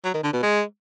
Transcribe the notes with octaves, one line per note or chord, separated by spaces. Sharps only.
F#3
D#3
D3
B2
G#3